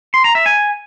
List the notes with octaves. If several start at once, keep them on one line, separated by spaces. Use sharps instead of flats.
C6
A#5
E5
G#5